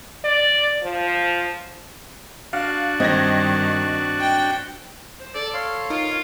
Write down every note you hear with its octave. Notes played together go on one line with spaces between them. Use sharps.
D5
F3
D4 F#4 F5
G2 D#3 C4 D#5 G#6 A#6
G5
C5
A4 D5
C#5 F5 C6
D#4 F4 A#4